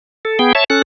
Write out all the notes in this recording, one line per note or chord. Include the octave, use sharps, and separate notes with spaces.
A4
B3 G#4 G5
C#5 E5 A5
C#4 A4 F#6